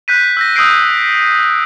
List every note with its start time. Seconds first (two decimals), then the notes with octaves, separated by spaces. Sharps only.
0.08 F#6 G6 B6 D#7
0.37 E6 G6 A#6
0.56 D#6 E6 G6 A#6 C7 D7